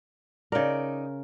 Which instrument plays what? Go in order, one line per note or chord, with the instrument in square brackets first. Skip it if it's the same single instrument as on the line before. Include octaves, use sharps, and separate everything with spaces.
[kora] C#3 A#4 [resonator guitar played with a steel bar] D#4 D5